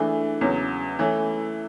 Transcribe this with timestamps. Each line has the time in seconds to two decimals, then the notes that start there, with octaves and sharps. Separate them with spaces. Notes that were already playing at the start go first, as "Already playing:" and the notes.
Already playing: E3 A3 D4 G#4
0.41 E2 C#3 F#3
0.99 E3 A3 C#4 E4